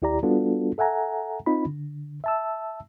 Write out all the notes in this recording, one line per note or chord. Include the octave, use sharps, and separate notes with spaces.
D#2 E4 G4 D5 A#5
G3 B3 D4 F4 F#4 A4
A4 E5 F#5 G#5 A#5
C4 D#4 F4 B5
D3
E5 A5 E6